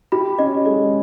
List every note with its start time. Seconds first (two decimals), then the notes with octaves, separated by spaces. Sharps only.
0.12 G4 B5
0.39 C#4 D#5
0.65 G#3 D#5